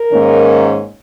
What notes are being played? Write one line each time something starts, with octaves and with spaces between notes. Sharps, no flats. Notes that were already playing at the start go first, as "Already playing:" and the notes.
Already playing: A#4
G#2 D#3 A#3 C#4